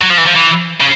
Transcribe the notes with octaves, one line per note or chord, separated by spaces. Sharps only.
F#3
F3
E3
F3
E3
C#3